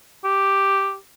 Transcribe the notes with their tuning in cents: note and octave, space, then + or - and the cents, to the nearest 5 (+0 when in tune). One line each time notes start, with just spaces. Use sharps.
G4 +0